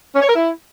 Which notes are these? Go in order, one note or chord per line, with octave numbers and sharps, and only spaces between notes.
C#4
C#5
A#4
E4